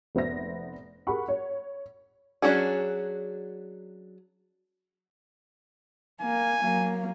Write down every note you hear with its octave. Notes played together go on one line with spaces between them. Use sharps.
F1 B3 C5 E5 A#6
G4 G#4 A#4 F#5 B5 C#6
C#5
F#3 C#4 D4 F#4 G#4
A#3 G#5
F#3 A#3